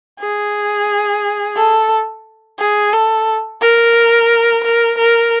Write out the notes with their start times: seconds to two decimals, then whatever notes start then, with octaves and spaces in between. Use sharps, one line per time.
0.20 G#4
1.56 A4
2.59 G#4
2.93 A4
3.61 A#4
4.64 A#4
4.97 A#4